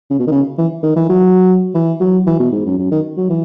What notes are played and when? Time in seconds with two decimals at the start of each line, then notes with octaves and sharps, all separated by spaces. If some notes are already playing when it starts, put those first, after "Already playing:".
0.10 C#3
0.19 B2
0.27 D#3
0.31 C#3
0.58 E3
0.83 D#3
0.96 E3
1.09 F#3
1.74 E3
2.00 F#3
2.26 E3
2.39 B2
2.52 G#2
2.66 F#2
2.78 F#2
2.91 D#3
3.17 F#3
3.29 E3